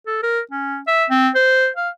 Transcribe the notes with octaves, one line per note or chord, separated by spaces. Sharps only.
A4
A#4
C#4
E5
C4
C5
F5